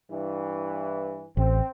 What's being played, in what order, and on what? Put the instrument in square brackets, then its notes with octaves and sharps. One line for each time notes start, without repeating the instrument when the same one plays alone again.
[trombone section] G2 E3
[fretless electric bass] A1 [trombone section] C4